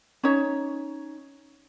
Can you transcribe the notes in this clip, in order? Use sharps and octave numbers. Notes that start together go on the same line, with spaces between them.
C#4 D#4 C#5